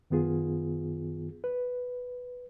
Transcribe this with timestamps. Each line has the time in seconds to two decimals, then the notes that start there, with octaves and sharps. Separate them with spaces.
0.10 F#2 D#3 B3 F4 G#4
1.44 B4